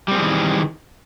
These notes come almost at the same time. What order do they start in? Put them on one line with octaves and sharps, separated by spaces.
G3 C4 G#4 E3 D#3